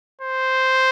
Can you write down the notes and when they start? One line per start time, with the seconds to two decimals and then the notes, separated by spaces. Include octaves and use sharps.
0.21 C5